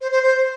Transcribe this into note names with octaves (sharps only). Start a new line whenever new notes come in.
C5
C5
C5